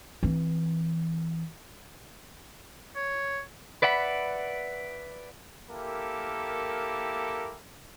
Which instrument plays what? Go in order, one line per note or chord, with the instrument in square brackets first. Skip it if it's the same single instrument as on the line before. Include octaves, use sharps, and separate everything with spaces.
[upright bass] E3 C4
[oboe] C#5
[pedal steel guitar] B4 D5 E5 F#5 B5
[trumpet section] A#3 E4 G4 A4 A#4